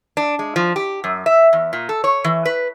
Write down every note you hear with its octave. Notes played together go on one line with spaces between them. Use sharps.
D4
G#3
F3
G4
F#2
E5
E2
A#2
A4
C#5
E3
B4